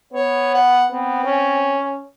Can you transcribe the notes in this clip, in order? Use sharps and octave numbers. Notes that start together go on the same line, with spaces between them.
B3 C#5
F#5
B3 C4
C#4